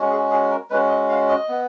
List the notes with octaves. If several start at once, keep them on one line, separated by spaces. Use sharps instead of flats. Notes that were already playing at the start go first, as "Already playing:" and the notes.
Already playing: G#3 C#4 F#4
G#4
G#4
A#4
G#3 C#4 F#4 B4
D#5
F5
D#5
B3